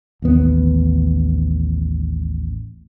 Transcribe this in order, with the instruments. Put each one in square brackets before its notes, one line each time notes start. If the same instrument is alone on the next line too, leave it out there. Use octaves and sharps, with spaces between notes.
[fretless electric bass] A1 D#2 B3